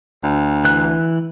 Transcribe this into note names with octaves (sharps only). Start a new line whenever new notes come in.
D2
E3 F#6